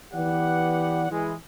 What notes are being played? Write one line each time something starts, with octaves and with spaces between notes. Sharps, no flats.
E3 B3 G4 D5 F#5
E3 G#3